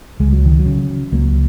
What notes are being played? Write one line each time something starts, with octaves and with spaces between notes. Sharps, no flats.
C#2 G#3
F#3
D#3
F#3
C#3
C#2 F#3 A#3